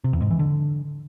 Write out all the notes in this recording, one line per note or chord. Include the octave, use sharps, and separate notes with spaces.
C3
E2
G#2
E3
D3